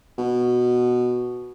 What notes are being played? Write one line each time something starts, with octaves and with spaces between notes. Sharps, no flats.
B2